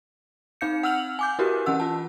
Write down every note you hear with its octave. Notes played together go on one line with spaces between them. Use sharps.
C4 D#4 F5 G6 C#7
F#5 E6 F6 F7 F#7
G#5 D6 G6
E4 F#4 G4 A#4 B4
E3 C#4 F#5 E6
F4 A5